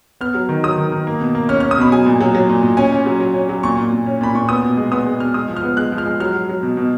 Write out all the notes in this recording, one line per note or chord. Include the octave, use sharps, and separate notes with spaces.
B3 F6
F#3
D#3
F#3 D#6
D#3
D#3
A#3
B2
A#3
C#4 F6
C#4 F6
D#6
B2 B5
F#3 G#5
A#2
F#3
F#3
A#2
A#2
C#4 G#5
C#4
F#3
F#3
C#4
F#3
A#2 C#6
A#2
A#2
C#4
A#2 B5
A#2 C#6
B3 D#6
B2
G#3
B3 D#6
G#3
B2 F6
G#3 D#6
F3
F6
B3
G#3 F#6
F3
F6
G#3
F#3 F6
F#3
F#3
B2
B2